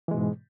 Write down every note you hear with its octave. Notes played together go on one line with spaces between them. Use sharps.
G#2 B2 E3 G#3